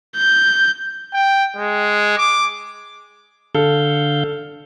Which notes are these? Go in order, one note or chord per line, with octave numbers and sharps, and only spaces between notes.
G6
G5
G#3
D6
D3 A4 F5 G6